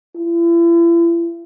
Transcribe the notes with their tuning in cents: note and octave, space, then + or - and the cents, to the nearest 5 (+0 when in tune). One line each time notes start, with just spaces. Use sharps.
E4 +40